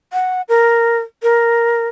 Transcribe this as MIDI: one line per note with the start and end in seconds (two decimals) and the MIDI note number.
0.13 0.42 78
0.49 0.99 70
1.23 1.88 70